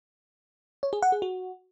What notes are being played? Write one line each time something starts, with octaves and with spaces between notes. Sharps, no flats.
C#5
G#4
F#5
G#4
F#4